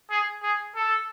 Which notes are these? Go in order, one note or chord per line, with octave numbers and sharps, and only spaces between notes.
G#4
G#4
A4